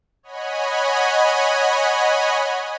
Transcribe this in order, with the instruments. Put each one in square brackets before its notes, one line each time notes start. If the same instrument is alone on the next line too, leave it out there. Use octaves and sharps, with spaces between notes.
[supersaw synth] C#5 D#5 F#5 G#5 B5